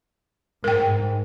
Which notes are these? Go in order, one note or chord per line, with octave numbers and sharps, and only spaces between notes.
G#2 A#4 G5